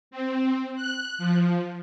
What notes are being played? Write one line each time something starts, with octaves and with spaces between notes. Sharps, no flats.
C4
F#6
F3